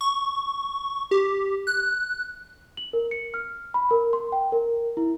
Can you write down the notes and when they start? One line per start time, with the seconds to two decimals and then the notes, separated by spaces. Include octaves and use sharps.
0.01 C#6
1.11 G4
1.67 F#6
2.77 F#7
2.93 A#4
3.11 C#7
3.34 F6
3.74 B5
3.91 A#4
4.13 C6
4.32 G5
4.52 A#4
4.97 E4